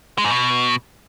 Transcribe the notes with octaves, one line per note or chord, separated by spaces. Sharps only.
G#3
G#2
B2